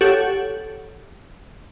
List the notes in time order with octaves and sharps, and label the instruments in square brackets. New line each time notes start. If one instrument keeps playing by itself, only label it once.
[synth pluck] G4 A4 C#5 F#5